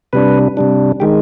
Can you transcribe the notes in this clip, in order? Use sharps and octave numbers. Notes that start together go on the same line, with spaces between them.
C3 G3 D4 B4
C3 G3 D4
D#3 G#3 G4